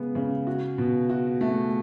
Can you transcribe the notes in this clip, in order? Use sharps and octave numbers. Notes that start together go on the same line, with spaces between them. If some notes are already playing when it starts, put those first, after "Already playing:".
Already playing: C#3 G#3 B3
C#3
F#4
B2
F#4
A3